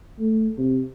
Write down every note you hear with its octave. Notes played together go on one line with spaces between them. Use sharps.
A3
C3